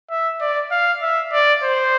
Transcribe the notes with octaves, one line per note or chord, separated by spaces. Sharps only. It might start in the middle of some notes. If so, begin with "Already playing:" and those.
E5
D5
F5
E5
D5
C5